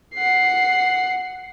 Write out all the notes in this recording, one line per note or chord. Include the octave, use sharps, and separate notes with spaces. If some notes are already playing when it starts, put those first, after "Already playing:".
F#5 C7